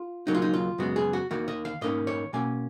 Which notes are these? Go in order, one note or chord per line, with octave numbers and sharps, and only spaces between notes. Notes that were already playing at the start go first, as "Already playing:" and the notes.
Already playing: F4
D#2 C#3 F#3 A#3 D#4
F4
D#4
F4
F#2 C#3 G#3 B3 F#4
G#4
F#4
D#2 D#3 A#3 F#4
D#5
F5
G#2 D#3 A#3 C#4 D#5
C#5
B2 A#3 C#4 G#5